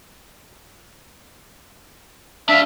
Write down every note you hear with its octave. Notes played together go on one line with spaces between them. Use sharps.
D4 E5 F5